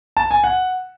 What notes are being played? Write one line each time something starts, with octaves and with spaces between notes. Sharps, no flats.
A5
G#5
F#5